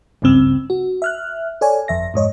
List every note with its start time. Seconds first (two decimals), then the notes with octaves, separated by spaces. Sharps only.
0.22 G#1 C#2 G2 C#3 C4 E6
0.70 F#4
1.02 E5 F6 F#6
1.61 A4 C#5 D5 G#5
1.88 G1 F2 E5 A#6
2.14 F2 G#2 C#5 D#5